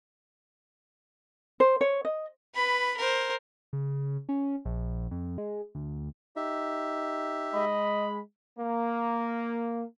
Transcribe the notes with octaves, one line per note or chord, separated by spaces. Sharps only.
C5
C#5
D#5
B4 B5
A#4 C5
C#3
C#4
A#1
F2
G#3
D2
D#4 G4 E5
G#3 D#5 B5
A#3